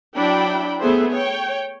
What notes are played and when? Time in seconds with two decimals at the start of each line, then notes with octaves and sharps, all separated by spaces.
0.16 F#3 D4 E4 G5 B5
0.80 A3 B3 G#4 C5 E5
1.11 C#5 G5